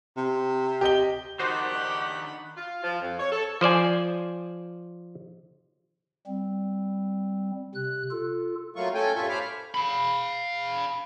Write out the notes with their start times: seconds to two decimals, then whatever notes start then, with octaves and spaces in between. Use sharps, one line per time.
0.16 C3
0.81 G4 D#5 G7
1.39 D#3 D4 D#4 F#4 G4 C5 F#5 B5
2.56 F4
2.84 F3
3.01 F2
3.19 C#5
3.31 A4
3.61 F3 C5 D5 G#5
6.27 G3 C4
7.75 C3 F#6
8.11 F4 A4
8.76 F#3 A3 A#3 F4 C#6
8.94 A3 C#4 A4 G5 G#5
9.15 G2 A#2 F4 A4 E5 C#6
9.29 C5 C#5 F5 B5 D6 F6
9.75 F5 B5